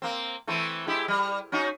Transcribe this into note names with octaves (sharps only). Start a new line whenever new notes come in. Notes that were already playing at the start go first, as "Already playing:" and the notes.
A#3 C4
E3 A3 C4
G#3 E4 G4
G3
C#4 D#4 F#4